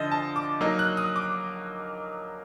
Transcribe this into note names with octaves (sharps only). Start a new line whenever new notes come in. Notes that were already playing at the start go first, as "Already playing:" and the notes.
Already playing: D3 F3 D#5 E5
A5
D6
F#3 A#3 D#4
F#6
D#6
D6